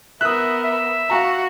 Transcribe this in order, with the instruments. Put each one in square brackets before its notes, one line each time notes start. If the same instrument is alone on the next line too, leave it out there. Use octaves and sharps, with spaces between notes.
[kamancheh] B3 A#4 [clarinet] E5 [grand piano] D#6 F#6
[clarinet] E5
[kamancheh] F#4 [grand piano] F5 G#5 A#5